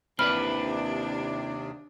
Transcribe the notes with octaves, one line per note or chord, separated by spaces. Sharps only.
D#2 C3 C4 D4 E4 B4 B5 F6